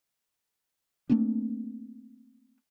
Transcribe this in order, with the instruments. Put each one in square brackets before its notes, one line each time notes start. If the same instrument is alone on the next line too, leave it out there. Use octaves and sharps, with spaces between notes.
[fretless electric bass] A3 A#3 C4 D4